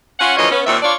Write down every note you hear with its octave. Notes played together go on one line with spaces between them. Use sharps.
C#4 F4 F#5
D2 E3 F3 C#4 C#5 D#5
B3 C#4
D#2 A#2 C4 C#4 E5
D4 F4 C#5 D5